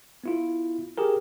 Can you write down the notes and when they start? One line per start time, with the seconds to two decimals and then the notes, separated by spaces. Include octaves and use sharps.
0.24 B3 E4 F4
0.98 G4 G#4 A#4